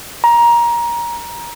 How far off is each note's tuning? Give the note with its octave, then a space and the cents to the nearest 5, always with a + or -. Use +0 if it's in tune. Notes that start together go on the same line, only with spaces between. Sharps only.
A#5 +20